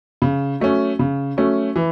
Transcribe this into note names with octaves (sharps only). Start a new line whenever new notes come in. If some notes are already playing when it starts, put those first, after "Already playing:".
C#3
F#3 A3 C#4
C#3
F#3 A3 C#4
E3